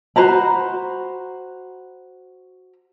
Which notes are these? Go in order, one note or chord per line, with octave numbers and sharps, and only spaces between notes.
F#4 C5 A#5 B5